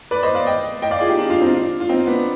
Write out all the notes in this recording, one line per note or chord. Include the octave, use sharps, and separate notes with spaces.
B4 D5
C5 D#5
D5 F5
D#5 G5
D#5 G5
D5 F5
F4 G#4
D#4 G4
D4 F4
D4 F4
C4 D#4
D4 F4
F4
C4 D#4
B3 D4